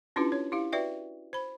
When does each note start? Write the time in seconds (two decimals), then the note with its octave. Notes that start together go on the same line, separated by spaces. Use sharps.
0.16 C#4 D4 E4 F4 G4 B4
0.32 C#5
0.52 E4 G4 F5
0.72 F#4 B4 D5 E5 G5
1.33 C5 B5